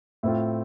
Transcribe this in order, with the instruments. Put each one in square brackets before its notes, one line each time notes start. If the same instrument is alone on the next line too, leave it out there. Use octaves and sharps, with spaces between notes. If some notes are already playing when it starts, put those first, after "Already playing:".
[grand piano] A2 A3 C4 F4